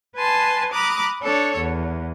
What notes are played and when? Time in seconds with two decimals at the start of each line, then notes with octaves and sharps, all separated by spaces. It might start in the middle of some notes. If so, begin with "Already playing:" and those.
0.16 B4 G#5 A5 C6
0.73 A#5 B5 D6 D#6 F#6
1.21 D4 A4 C#5
1.55 E2